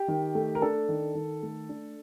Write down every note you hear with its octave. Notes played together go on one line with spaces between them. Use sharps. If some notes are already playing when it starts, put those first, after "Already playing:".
Already playing: G4
D#3
A3
A#4
D4 A4
D#3
D#3
A3
D4